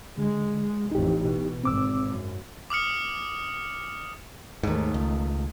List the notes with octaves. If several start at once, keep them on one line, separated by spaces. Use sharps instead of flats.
D3 G#3
A1 F2 D#4 G4
B2
G#1 C4 D6 E6
F#2
D6 D#6 F6 C#7
D#2 G#2 D#3 A3
C#2